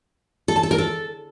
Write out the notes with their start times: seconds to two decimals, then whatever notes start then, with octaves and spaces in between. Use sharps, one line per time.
0.48 A4
0.56 A5
0.63 A4
0.71 A#4
0.78 A4